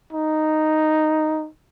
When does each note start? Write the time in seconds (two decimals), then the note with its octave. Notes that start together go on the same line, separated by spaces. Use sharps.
0.13 D#4